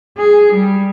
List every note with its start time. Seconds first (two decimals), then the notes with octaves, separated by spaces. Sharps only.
0.17 G#4
0.53 G3